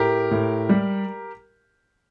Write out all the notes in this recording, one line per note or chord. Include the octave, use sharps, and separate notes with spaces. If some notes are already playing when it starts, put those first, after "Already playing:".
Already playing: A2 G4 A#4
A2
G3